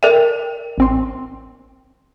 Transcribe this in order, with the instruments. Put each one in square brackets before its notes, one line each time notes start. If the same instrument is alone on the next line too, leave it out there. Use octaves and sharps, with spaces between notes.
[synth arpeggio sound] A4 D5 E5 [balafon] A#4 G5
[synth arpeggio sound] A1 C4 C6